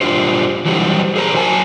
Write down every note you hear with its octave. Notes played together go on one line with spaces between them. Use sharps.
G2 C3 D4 F4 G4 C5
E3 F#3 G3 G4 C5
G#4 A#4 C5 A#5
F#3 A#4 G#5 A5